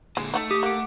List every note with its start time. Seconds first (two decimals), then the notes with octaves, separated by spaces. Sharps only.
0.17 A#2 D3 G#3
0.34 A3 D#4 F#4 A4
0.51 G4 D#6
0.63 A#3 F#5 D6